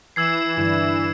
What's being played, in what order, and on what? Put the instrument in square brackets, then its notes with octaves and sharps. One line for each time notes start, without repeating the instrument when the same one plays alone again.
[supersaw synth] E3 E7 [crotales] E6 G#6 C7
[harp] G2 D3 G3 [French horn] E4